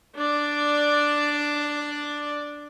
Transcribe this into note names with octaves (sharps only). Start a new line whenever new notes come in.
D4 D5